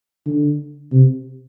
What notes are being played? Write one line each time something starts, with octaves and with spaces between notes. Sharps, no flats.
D3
C3